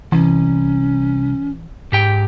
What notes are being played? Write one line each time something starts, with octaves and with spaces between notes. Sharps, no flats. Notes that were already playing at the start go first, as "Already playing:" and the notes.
C2 E3 C#4
G#2 G4 G5